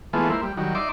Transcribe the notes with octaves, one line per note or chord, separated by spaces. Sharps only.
E3 G#3 A3 B3 F4
A#3 E4 C5
G3
D#3 F#3 G3
D#4 D5 E5 C6 D6